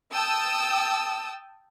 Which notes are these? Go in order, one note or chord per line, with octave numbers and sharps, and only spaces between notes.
G5 A5 D#6 E6